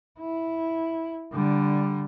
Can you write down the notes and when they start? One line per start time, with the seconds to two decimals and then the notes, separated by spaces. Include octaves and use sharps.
0.19 E4
1.32 D3 G3